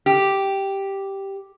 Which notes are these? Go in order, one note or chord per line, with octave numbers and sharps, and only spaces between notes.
G4